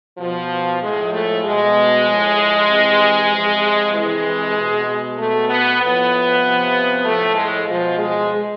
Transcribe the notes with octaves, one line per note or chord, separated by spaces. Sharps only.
B2 F3
A2 F3 G#3
A3
B2 G#3
A2 F3
C3 E3
C3 F3
C3 E3 G#3
B2
B2 A3
B3
A2 F3 B3
C3 F3
A2 F3 A3
G#3
B2 F3
G#3